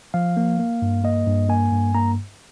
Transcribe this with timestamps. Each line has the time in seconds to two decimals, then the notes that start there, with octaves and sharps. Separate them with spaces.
0.14 F3 F5
0.37 A#3
0.59 A#3
0.82 G2
1.04 A#3 D#5
1.27 G2
1.49 A#3 G#5
1.72 G2
1.94 A#3 A#5